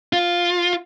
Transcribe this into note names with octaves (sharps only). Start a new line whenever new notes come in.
F4